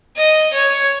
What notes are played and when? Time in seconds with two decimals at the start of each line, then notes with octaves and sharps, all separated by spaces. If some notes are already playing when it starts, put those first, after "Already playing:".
0.17 D#5
0.53 C#5